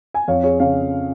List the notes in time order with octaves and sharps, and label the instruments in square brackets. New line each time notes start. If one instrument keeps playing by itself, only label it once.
[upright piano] G#5
F2 C#5 F5
G#4 C#5
C#3 C#5 F5